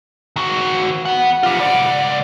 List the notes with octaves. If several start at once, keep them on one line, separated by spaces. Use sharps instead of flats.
D#3 F#4
B4 F#5
F4 G4 F#5
C#2 D5